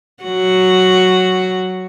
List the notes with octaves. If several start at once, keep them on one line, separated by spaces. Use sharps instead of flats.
F#3 F#4